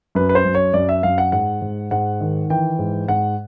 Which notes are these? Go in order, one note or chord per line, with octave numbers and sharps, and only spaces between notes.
F#2 B4
B4
C5
F#2
C#5
F#2 D5
E5
F#2 F5
F#5
G#2 F#5
G#2
G#2 F#5
D#3
E3 G5
G#2
G#2 F#5